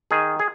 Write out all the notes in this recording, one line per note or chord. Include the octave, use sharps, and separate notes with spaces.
D#3 G#4
G#4